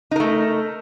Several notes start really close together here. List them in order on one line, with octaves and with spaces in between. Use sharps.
D#4 A#4 A3